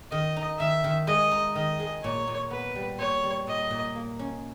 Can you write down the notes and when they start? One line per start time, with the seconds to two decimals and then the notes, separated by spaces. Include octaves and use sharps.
0.11 D#3 D#5
0.36 D#4
0.59 D#3 E5
0.84 D#3
1.07 G#3 D#5
1.32 D#4
1.55 D#3 D#5
1.80 G#3
2.03 A#2 C#5
2.27 A#2
2.51 B3 B4
2.75 G3
2.99 A#2 C#5
3.23 G3
3.47 A#2 D#5
3.71 A#2
3.96 A#3
4.19 C#4